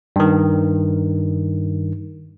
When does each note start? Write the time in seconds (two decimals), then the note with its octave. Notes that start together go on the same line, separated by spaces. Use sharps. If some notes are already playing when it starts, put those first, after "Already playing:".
0.16 G2 D#3